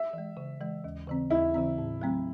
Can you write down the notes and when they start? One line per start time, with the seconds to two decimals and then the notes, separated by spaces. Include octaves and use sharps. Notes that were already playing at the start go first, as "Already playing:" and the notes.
Already playing: E5
0.13 E3 G#3
0.37 C#3
0.61 E3 G#3
0.84 D#2
1.08 C#3 E3 C4
1.30 D#2 E4
1.55 C#3 E3 C4
1.78 A2
2.02 F#3 A3 C4